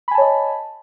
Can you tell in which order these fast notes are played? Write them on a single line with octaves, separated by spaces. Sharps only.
B5 G#5 A5 C#5 D#5